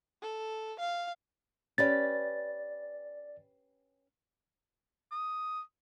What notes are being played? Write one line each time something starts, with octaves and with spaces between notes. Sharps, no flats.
A4
F5
C#4 G4 B4 D5 A6
D#6